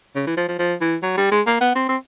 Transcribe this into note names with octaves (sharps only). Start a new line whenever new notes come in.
C#3
E3
F3
F3
F3
E3
F#3
G3
G#3
A#3
B3
C4
C4